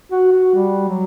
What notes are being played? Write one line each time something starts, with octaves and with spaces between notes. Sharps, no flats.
F#4
F#4
G3
F#3